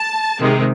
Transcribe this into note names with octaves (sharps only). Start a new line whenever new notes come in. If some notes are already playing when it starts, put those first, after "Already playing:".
Already playing: A5
C3 D#3 G#3